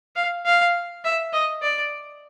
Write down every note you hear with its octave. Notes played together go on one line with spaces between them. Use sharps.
F5
F5
E5
D#5
D5